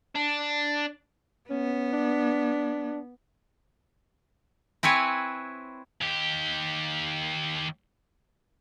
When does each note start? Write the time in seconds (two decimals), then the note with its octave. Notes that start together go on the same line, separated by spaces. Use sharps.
0.15 D4
1.50 B3 C#4
1.93 D4
4.83 C4 E4 B4 C#5 G#5
6.01 D#2 G4